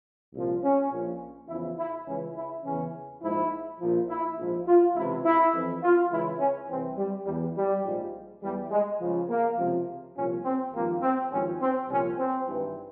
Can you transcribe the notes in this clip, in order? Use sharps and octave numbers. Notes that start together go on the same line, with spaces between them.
C2 A#2 F3
C#4
A#1 A#2 F3
E2 C#3 F3 E4
E4
C#2 C#3 E3 C#4
E4
E2 C#3 E3 C#4
A#1 G#2 F3 E4
A#1 A#2 F3
E4
A#1 G#2 F3
F4
C#2 C3 E3 E4
E4
F2 E3
F4
C#2 C#3 E3 E4
C#4
C2 C3 E3 C4
G3
E2 E3 G3
G3
A#1 G#2 F3
E2 E3 G3
G#3
C#2 C#3 F3
A#3
C#2 C3 F3
C2 A#2 F3 C#4
C4
G#1 G2 F3 A#3
C4
G#1 G2 F3 C#4
C4
C2 A#2 F3 C#4
C4
G#1 G2 E3